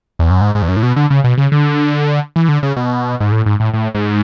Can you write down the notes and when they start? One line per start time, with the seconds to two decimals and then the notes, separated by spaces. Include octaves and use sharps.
0.19 E2
0.30 F#2
0.41 G#2
0.55 G#2
0.62 E2
0.68 F#2
0.77 A2
0.83 B2
0.96 D3
1.10 C#3
1.24 B2
1.38 C#3
1.52 D3
2.36 E3
2.49 D3
2.63 C#3
2.76 B2
3.20 G#2
3.32 A2
3.46 G#2
3.60 A2
3.73 A2
3.95 G#2